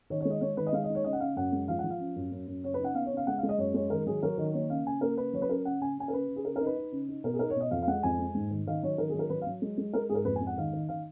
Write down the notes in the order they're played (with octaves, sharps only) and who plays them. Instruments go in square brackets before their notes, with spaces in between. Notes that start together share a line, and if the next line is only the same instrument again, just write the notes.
[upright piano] D#3 C#5
C#5
G#3
D#5
G#3 C#5
D#3 B4
D#5
G#3 F5
D#5
D#4
C#5
C#3 D#5
F#5
C#3 F5
F#2 F#5
G#3
F3 F5
F#5
F3
F5
C#4
F#2
F#2
F#2
C#3 C#5
B4
D#4
F#5
B3 F5
C#5
C#3
F5
G#3 F#5
F5
G#3
D#5
F#2 C#5
G#3 C#5
D#3 A#4
F#3 G#4
F#3 A#4
D#3
A#3 C#5
C#3 F5
C#3 G#5
A#3 A#4
C#3 B4
F#3 C#5
B4
C#4 A#4
C#3 F#5
C#3 G#5
C#4 G#5
A#4
C#3 B4
C#3
G#4
C#3 A#4
A#4
D#4
B4
D#4
C#3
D#4
B2 A#4
G#4
D#4 A#4
C#5
B2 D#5
F2 F5
F5
G#3 F#5
F2 G#5
G#3
G#2
D#3
D#3 F5
F#3 C#5
D#3 A#4
G#4
F#3 A#4
F#3 B4
F5
F#3
G#3
G#3
G#3 A#4
G#2 G#4 A#4
F2 B4
G#5
G#3
F#5
D#3 F5
D#3
D#3 F5